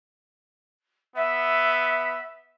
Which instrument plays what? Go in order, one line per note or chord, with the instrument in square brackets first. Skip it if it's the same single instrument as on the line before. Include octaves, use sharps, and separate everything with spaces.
[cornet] B3 [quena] E5